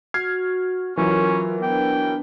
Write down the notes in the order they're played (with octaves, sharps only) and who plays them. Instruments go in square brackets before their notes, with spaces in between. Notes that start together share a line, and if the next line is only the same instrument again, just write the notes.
[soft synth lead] F#4 [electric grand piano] F6 G#6 C7
[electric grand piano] E3 F#3 [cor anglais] C#4 [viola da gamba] F4 [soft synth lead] A#4
[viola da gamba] B3 D4 [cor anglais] G5